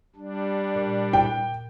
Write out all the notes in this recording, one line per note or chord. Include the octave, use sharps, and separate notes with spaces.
G3 D4
A#2
G5